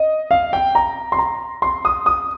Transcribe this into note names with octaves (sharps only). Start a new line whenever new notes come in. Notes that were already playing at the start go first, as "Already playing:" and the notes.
Already playing: D#5
F5
G5
A#5
C6
A#5
C6
D#6
D#6